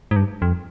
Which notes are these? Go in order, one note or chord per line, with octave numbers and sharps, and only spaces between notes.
G#2
G2
F2